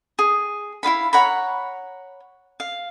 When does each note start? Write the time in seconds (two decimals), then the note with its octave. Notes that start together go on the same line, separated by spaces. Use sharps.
0.19 G#4
0.83 E4 F4 F5 B5
1.13 C#5 F#5 A#5 B5
2.60 F5